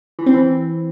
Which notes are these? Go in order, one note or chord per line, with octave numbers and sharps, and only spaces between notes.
E3
C4
E3